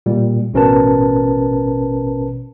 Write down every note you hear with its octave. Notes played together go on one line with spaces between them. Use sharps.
A#2 G3
A1 B2 C#4 A#4 B4 A5